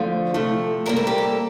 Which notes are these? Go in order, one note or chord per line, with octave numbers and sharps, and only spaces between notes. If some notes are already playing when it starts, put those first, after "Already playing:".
Already playing: D3 F3 A3
C3 F3 A3
C3 G3 A#3 A#4
A4
G4
A4